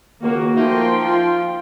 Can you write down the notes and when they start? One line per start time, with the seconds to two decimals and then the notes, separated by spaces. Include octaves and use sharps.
0.21 C#2 D#3 A#3 F#4
0.55 F3 A3 A#3 D#4 G5 C6
1.05 F4